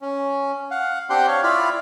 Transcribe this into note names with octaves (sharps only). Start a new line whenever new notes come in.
C#4
F5 F#5
C4 D4 G4 F#5 G5 C6
C#5 F5
E4 F4 D5 B5 F6